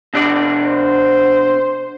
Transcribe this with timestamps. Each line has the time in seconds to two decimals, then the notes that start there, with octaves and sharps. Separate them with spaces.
0.14 B2 D4 D5
0.66 C5